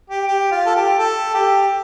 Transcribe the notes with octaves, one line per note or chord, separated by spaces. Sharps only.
G4
G4
F4
A4
G4
A4
G4